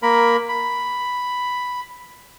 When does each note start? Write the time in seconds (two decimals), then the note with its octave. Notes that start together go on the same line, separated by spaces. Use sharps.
0.03 A#3 A#4 B5
0.48 B5